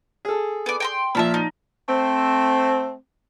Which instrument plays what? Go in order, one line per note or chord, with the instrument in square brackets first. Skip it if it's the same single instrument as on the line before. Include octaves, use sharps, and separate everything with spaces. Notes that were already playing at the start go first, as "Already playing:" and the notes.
[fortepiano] G#4 A4
[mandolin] B3 D5
G5 A#5 C6
[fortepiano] A#2 F3 [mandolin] E5 A5 B5
[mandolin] D#4
[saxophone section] A3 C4